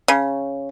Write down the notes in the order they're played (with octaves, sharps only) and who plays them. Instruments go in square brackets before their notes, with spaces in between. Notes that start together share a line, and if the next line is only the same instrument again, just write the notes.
[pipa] C#3